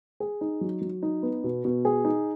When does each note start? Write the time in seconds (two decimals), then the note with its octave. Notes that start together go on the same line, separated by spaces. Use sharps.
0.20 G#4
0.41 D#4
0.61 F#3
0.81 F#3
1.03 D#4
1.23 B3
1.44 B2
1.65 B2
1.85 G#4
2.05 D#4